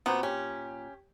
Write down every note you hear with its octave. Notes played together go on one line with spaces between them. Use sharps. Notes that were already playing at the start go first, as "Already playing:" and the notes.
A#2 B3 C4 F#4 C5
C#4 G4